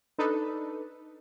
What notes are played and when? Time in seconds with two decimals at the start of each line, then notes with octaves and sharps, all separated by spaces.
0.18 D4 D#4 A4 B4